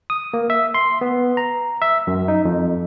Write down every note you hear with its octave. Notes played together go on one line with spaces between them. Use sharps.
D#6
A#3
E5
C6
B3
A#5
E5
F#2
D#4
F2